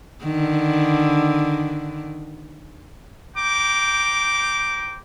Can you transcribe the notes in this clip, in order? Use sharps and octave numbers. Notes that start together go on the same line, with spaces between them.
D3 D#3
C5 G5 A#5 D6